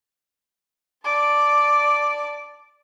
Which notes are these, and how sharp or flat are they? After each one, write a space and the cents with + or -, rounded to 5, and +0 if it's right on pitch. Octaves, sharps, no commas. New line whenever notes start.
D5 +0 A5 +0